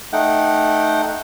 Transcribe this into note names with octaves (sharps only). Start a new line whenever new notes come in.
A3 D#4 F#5 G5